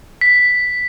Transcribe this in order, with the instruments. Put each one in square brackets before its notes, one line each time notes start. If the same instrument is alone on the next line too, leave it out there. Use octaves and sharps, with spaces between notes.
[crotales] B6